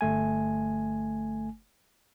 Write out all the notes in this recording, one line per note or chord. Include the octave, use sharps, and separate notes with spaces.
G1 A3 G#5